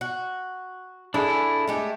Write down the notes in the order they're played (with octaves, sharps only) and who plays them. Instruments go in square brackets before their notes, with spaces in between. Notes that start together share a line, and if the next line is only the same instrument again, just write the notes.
[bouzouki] F#4
[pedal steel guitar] D4 E4 [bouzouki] G#4 A4
[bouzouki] G#3 A3 G4